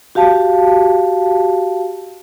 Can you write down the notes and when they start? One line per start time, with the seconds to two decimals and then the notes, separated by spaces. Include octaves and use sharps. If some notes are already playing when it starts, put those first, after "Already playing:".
0.15 F#4 G4 F5 A5